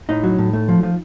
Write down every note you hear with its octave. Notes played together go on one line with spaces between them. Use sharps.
A2 D#4 D#5
F#3
A2
A3
F3
F3